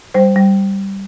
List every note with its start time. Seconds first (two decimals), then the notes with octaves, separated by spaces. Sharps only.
0.14 G3 C5
0.36 G3